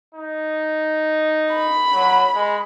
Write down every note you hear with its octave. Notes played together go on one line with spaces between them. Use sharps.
D#4
B5
F#3
G#3